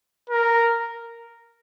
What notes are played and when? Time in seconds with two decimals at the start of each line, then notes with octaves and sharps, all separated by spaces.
0.30 A#4